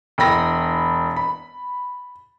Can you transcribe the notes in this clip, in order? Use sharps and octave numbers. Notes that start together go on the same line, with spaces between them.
E1 G5 B5 A#6
B5